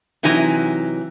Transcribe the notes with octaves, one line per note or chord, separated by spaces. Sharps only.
C3 E3 F#3 D#4 G#5 A#5